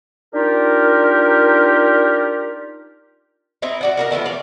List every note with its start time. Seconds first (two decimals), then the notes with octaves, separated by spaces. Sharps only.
0.34 D4 D#4 F4 G4 A#4
3.62 C4 D#4 E4
3.81 F#4 D5 F#5
3.97 F#4 A#4 D#5
4.11 F3 F#3 A3 B3
4.26 E3 D5 F5